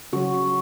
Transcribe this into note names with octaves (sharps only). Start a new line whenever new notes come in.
C#3 F#3 F#4